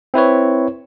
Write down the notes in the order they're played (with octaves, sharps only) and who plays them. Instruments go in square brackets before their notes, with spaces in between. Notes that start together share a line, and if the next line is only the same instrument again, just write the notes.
[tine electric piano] C4 E4 B4 C#5